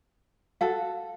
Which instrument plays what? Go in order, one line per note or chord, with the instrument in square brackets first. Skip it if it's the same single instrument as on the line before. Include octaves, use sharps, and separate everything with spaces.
[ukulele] F#4 A4 [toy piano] F5